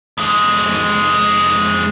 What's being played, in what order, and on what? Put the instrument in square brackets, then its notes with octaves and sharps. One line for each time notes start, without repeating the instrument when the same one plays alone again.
[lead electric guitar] F2 G#3